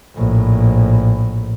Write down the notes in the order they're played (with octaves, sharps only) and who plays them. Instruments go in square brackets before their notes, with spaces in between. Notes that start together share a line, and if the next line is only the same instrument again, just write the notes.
[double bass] A#1 A2